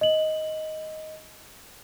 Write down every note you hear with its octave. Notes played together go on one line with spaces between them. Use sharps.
D#5 F#7